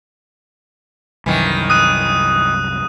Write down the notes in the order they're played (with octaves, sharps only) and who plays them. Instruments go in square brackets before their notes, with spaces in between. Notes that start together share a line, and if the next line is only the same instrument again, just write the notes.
[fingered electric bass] C2 F#2 [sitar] D#3 E3
[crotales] D#6 F#6 D#7